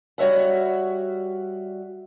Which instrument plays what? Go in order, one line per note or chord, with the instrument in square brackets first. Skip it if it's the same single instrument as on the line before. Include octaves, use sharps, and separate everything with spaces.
[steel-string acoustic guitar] G3 F#4 C#5 E5 F#5